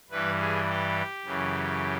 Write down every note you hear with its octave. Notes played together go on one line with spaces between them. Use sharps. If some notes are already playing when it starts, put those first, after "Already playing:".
G2 E3 G3 B4
G#4
G4
F#2 C#3 E3